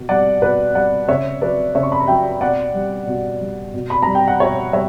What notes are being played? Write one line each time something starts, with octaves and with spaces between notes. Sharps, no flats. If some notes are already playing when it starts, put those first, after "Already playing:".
Already playing: B2
G3 D5 F#5
B2 B4 D5
G3 D5 F#5
C#3 C#5 E5
F#3 B4 D5
C#3 C#5 E5
C#6
B5
A#5
F#3 E5 G5
B2 D5 F#5
G3
B2
G3
B2
B5
G3 A#5
G5
F#5
B2 C#5 E5
G3 C#5 E5